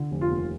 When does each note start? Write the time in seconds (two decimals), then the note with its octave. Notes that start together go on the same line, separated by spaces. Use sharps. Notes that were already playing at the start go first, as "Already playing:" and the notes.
Already playing: D3
0.11 F1
0.21 F4
0.30 D#2